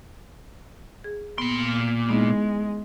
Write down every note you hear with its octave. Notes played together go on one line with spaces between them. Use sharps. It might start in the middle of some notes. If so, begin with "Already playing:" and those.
G#4
A#2 B3 C6
G#3 B3 D#4 E4